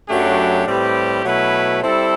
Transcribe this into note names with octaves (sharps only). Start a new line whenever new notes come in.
F#2 F#3 A3 D4 G4
A2 G3 C4 G4 B4
B2 F#3 A3 E4 B4
G3 C4 E4 A4